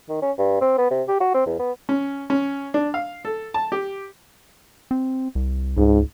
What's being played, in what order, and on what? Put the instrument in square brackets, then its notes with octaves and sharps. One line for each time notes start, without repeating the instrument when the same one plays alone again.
[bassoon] D#3
C#4
G2
C4
B3
C3
G4
F#4
C4
E2
B3
[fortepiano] C#4
C#4
D4
F5
A4
A5
G4
[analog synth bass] C4
C2
[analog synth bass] C#2 [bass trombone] G#2